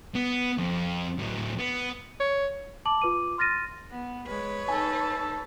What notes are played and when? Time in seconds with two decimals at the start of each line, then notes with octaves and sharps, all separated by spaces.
0.15 B3
0.58 F2
1.19 A2 F#3
1.59 B3
2.20 C#5
2.85 A5 D6 F#7
3.02 F4 B4 D6 D#7
3.38 C6 F6 A6 A#6 D#7
3.91 B3
4.27 G#3 B4 C#5
4.68 D#4 A4 G#5 A5